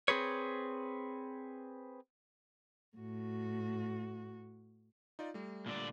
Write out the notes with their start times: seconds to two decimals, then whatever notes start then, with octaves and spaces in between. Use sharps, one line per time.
0.08 C4 G#4 B4 C#5
2.97 A2 F#4
5.19 D#4 F4 D5
5.34 G3 A3
5.66 A#2 D3 D5